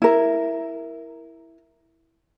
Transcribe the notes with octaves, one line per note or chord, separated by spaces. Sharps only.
E4 A#4